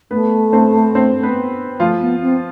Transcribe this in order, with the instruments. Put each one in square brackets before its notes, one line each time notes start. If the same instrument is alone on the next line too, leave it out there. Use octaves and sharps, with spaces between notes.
[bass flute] A3 [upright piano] B3 B4
[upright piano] C4 C5
C4 C5
B3 B4
[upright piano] F3 F4 [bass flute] A3
[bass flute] B3
C4